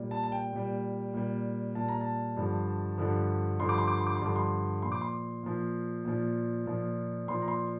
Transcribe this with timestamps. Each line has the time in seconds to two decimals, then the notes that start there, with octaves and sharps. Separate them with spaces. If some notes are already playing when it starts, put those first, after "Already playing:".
Already playing: A#2 G3
0.11 A5
0.24 A5
0.32 G5
0.53 A#2 G3
1.14 A#2 G3
1.75 A#2 G3 A5
1.88 A#5
2.01 A5
2.37 G2 D3 F3
2.98 G2 D3 F3
3.59 G2 D3 F3 C6
3.69 D6
3.78 C6
3.87 D6
3.98 C6
4.07 D6
4.16 C6
4.21 G2 D3 F3 D6
4.36 C6
4.82 A#2 F3 C6
4.92 D6
5.01 C6
5.43 A#2 F3
6.05 A#2 F3
6.66 A#2 F3
7.28 A#2 F3 C6
7.42 A#5
7.48 C6